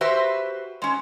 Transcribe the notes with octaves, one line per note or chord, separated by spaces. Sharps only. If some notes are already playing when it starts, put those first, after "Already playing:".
F#4 G4 B4 C5 E5
G#3 C#4